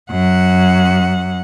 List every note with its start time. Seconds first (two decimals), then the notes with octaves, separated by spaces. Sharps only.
0.10 F#2 F#5